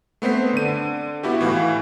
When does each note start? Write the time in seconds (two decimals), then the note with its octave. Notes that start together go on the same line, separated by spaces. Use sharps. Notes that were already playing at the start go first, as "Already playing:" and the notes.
0.22 A3 B3 C4 C5 B6
0.53 D3 D#7
1.23 B3 E4 F#4 G4
1.41 A2 E3 E4 F5